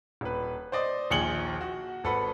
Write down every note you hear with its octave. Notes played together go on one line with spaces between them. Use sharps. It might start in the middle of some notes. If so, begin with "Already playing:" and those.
D#1 B4
C5 D5 D#5 C6
A#1 D#2 G#4 C#7 F#7 G7
F#4
G#1 A4 B4 F#5 B5